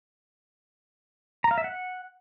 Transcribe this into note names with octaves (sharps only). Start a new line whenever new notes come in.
A#5
F5
E5
F#5